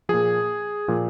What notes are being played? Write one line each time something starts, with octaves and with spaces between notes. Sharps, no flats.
A#2 F3 G#4
A#2 F3